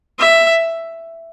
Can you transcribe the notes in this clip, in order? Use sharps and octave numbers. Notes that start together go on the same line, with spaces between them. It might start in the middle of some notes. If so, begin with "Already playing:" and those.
E5